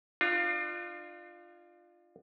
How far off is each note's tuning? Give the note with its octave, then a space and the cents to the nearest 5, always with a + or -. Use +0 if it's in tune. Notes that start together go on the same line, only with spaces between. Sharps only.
D4 +40 F4 +0